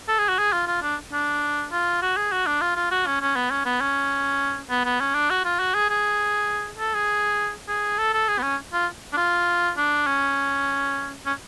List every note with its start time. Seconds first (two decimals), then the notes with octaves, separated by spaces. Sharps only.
0.08 A4
0.18 G#4
0.29 F#4
0.38 G#4
0.53 F4
0.67 F4
0.83 D4
1.12 D4
1.72 F4
2.02 F#4
2.17 G#4
2.32 F#4
2.46 D4
2.61 F4
2.76 F4
2.91 F#4
3.06 C#4
3.21 C#4
3.36 B3
3.50 C#4
3.65 B3
3.80 C#4
4.70 B3
4.85 B3
5.00 C#4
5.15 D4
5.30 F#4
5.45 F4
5.60 F#4
5.74 G#4
5.90 G#4
6.78 A4
6.94 G#4
7.68 G#4
7.98 A4
8.13 A4
8.28 G#4
8.39 B3
8.43 C#4
8.73 F4
9.13 D4
9.17 F4
9.77 D4
10.07 C#4
11.26 C#4